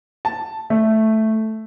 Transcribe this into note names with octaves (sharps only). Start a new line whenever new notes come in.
A5
A3